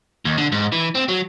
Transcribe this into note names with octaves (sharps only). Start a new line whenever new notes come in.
D#2
D3
G#2
E3
C4
F#3